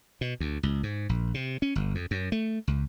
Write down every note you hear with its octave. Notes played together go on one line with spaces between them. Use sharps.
B2
D2
C#2
G#2
A#1
C3
C#4
G1
F2
F#2
A3
C#2